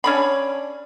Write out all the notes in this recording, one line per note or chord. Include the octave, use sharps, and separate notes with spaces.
C#4 D4 B5